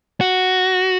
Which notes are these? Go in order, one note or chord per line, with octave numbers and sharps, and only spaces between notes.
F#4